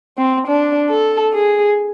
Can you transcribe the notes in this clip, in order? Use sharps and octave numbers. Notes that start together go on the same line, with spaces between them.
C4
D4
A4
G#4